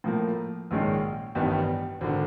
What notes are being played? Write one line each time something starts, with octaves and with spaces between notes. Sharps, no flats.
A2 F3 A#3
A#1 G#2 D#3 G#3 C#4
A1 G2 D#3 G3 B3
G#1 D3